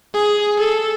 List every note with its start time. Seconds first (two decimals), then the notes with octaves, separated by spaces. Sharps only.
0.14 G#4
0.59 A4